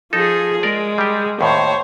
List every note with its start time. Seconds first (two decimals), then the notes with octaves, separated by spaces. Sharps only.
0.13 F3 D#4 G#4 A4
0.63 G#3 A#4 D5
0.98 G3 G4
1.41 D#2 A2 C5 C#5